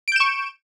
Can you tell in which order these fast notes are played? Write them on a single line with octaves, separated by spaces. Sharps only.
D7 G6 E7 C#6